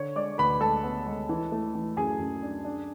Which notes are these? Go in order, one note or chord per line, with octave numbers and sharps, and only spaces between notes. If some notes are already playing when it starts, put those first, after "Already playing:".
Already playing: D3 C#5 C#6
G#3 D5 D6
D2 B4 B5
G#3 A4 A5
B3
G#3
E3
A3
E3
F#2 G#4 G#5
F#2
D4
D4